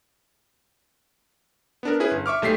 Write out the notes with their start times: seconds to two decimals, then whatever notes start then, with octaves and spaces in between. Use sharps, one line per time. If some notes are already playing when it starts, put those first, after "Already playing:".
1.83 B3 D4 A#4
2.00 C#4 E4 G#4 B4
2.11 G1
2.26 E5 C#6 D6 F6
2.42 B1 A3 G4 B6 C7